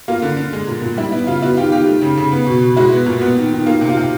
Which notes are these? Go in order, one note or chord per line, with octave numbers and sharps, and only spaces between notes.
A#3 F4
D3
D3
G#3
A#2
A#2
G3 E4
B3 E4
C#3 F4
B3 E4 F#4
D#3 F4 G4
D#3 F4 G4
A3
C#3
C#3
B3
B2
B2
G#3 E4 F#4
B3
A#2
B3
D#3
D#3
A#3 F4
C3
F4
C3